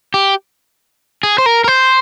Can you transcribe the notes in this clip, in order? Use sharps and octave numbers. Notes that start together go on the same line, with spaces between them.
G4
G#4
C5
A#4
A#4
C5